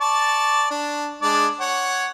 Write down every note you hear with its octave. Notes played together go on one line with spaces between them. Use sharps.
D5 A5 C#6
D4
G#3 D4 D5
C#5 F#5